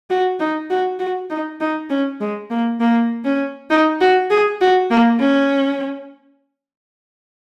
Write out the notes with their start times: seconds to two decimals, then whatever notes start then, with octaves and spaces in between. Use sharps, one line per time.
0.10 F#4
0.40 D#4
0.70 F#4
0.99 F#4
1.30 D#4
1.60 D#4
1.90 C#4
2.21 G#3
2.50 A#3
2.80 A#3
3.25 C#4
3.70 D#4
4.01 F#4
4.30 G#4
4.61 F#4
4.90 A#3
5.20 C#4